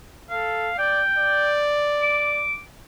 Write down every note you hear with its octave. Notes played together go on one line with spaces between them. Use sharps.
A4 F5
D5 G5
D5
D6